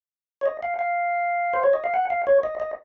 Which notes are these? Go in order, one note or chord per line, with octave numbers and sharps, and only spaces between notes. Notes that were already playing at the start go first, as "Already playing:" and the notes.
C#5
D#5
F5
F5
C5
C#5
D#5
F5
F#5
F5
C#5
D#5
D#5